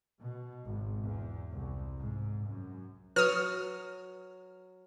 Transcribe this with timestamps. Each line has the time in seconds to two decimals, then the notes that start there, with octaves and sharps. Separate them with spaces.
0.18 B2
0.66 G#1
1.04 E2
1.52 C2
2.00 G#2
2.49 F#2
3.16 F#3 B4 D#6 F6